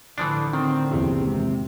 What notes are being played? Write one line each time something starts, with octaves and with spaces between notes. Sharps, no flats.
A2 D3 E3 F3 D4
D#3 C4
A#1 E2 C3 G4
G#1